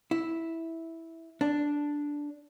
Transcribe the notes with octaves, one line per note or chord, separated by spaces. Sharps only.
E4
D4